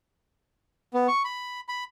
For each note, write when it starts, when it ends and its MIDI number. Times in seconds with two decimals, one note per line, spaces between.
0.94 1.07 59
1.08 1.23 85
1.24 1.60 83
1.68 1.84 83